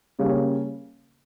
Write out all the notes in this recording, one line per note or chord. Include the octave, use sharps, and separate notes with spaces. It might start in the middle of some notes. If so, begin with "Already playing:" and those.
C#3 G3 A#3 C#4